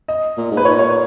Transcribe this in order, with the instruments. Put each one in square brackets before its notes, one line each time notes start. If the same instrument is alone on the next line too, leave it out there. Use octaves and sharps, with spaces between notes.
[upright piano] D#5
[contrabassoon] A#2
G#2
[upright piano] B4
[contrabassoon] A#2 [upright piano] C#5
[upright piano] C#5